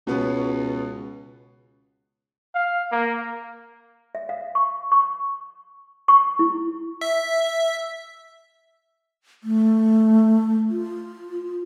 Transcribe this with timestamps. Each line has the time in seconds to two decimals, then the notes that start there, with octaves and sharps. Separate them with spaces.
0.07 C#2 B2 B3 C#4
2.55 F5
2.92 A#3
4.15 E5
4.29 F5
4.55 C#6
4.92 C#6
6.08 C#6
6.39 E4
7.01 E5
9.44 A3
10.70 F4